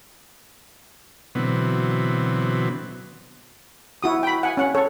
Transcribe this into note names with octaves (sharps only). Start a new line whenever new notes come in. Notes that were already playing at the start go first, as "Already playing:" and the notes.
B2 D3 E3 F#3 B3 C4
E4 F#4 D#6
G5 B5
F#5 G#5
C#4 F#5
A4 C#5